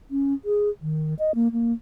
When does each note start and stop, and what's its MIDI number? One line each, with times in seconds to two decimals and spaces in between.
0.11 0.34 61
0.45 0.70 68
0.82 1.14 51
1.19 1.32 75
1.35 1.52 58
1.52 1.73 58